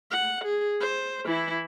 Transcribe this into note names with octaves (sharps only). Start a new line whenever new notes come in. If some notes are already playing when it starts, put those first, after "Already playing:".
F#5
G#4
C5
E3 E4